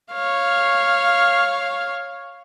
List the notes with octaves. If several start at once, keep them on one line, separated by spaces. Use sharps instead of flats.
C#5 F5